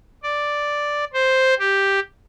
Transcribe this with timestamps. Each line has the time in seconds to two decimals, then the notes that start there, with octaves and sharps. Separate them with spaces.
0.23 D5
1.13 C5
1.59 G4